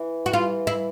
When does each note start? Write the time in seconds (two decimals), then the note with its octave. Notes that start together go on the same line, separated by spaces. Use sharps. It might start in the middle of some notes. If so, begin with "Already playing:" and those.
Already playing: E3
0.26 F#4
0.33 E3 F4
0.67 E4